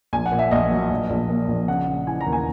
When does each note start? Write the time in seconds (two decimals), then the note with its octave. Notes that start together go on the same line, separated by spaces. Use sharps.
0.13 A#1 G#5
0.26 F#5
0.32 A#2
0.39 E5
0.51 A#1 D#5
0.71 F#3
0.91 A#1
1.10 A#1
1.29 A#2
1.49 A#1
1.68 C#3 F#5
1.88 C#3
2.07 E3 G#5
2.21 A#5
2.26 D#2
2.33 G#5